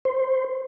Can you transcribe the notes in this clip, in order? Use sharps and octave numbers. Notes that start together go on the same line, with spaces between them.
C5